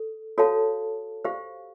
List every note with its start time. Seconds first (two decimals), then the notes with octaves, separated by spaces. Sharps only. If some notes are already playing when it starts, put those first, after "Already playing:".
Already playing: A4
0.38 F#4 A4 C#5 F5 A5
1.25 G4 C5 F5